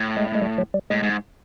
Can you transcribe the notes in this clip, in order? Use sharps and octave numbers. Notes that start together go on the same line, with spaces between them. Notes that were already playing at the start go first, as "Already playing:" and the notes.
Already playing: A2
G#3
A3
G#3
G3
F#3
G3
A2 G#3
G#2